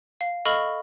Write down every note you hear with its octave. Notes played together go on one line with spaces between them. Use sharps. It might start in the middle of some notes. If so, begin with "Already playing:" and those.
F5
A4 D#5 F5 B5 C#6 F6